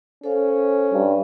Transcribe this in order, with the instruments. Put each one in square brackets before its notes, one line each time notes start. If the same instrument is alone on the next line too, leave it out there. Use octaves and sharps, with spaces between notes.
[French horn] C#4 [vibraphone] A4 C5 F5
[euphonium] G2